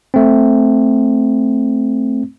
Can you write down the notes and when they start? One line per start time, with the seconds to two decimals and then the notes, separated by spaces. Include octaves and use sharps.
0.14 A3 C4